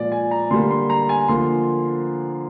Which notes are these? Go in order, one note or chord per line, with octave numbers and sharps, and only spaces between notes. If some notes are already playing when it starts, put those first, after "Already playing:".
Already playing: A#2 F3 G#3 D5
G#5
A#5
D3 G3 A#3 C6
C6
A#5
G#5
D3 F3 A#3 C6